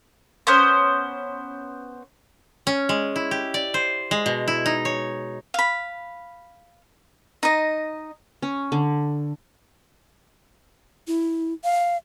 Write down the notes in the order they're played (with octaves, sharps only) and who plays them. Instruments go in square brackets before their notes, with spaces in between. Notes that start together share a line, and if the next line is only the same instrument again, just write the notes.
[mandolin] B3 C#4 C5
[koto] C#4
G#3
E4
G4
D5
C5
G#3
B2
E4
D#4
C#5
[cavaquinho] F5 B5
D#4 D#5
[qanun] C#4
D3
[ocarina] E4
F5